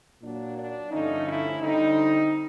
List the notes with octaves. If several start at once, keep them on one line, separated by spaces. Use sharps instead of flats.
A#2 F#3 A#3 D4
D4
G2 D3 F3 A3 C#4 D#4
E4
D3 G3 C4 D#4